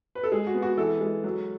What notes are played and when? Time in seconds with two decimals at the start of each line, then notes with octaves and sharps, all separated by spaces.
0.15 B4
0.23 A4
0.32 G#3 G#4
0.47 F#4
0.54 B3
0.62 F#4
0.78 E3 A4
1.01 G#3
1.24 F#3